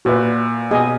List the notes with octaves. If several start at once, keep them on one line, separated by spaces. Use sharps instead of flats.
A#2 F#4 B4 E5
B2 G#4 D#5 G#5